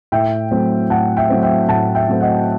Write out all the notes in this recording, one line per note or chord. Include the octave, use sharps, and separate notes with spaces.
A2 E5 G5
F#3 A3 C4
A2 F#5 A5
E5 G5
F#3 A3 C4
E5 G5
A2 F#5 A5
E5 G5
F#3 A3 C4
D#5 F#5